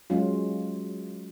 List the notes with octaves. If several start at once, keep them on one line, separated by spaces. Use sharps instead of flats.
F#3 G#3 C#4 F4